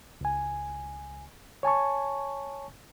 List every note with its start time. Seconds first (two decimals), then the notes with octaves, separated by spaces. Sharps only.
0.21 C#2 G#5
1.63 C#5 G#5 A5 C#6